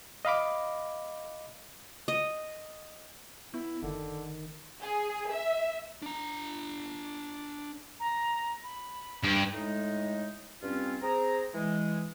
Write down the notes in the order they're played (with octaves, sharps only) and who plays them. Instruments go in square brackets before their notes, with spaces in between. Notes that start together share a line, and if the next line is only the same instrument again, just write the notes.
[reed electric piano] D#5 F5 B5 D6
[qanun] D#5
[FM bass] B3 [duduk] E4
[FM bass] F#1 [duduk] D3 [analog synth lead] D#3
[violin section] G#4
E5
[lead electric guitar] D4 A#5
[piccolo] A#5
B5
[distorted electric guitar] G2 [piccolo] D7
[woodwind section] A2 G#3 D#4
G2 C4 C#4 F4
C4 G#4 A#5
E3 G#3